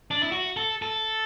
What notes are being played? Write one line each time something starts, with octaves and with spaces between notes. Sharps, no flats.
D4
E4
F#4
A4
A4